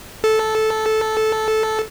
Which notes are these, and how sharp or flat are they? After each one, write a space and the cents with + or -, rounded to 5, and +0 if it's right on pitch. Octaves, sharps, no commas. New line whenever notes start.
A4 -10